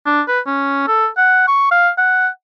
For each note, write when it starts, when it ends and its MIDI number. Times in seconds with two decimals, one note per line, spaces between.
0.06 0.21 62
0.28 0.40 71
0.46 0.83 61
0.87 1.08 69
1.17 1.45 78
1.47 1.68 85
1.71 1.89 77
1.98 2.28 78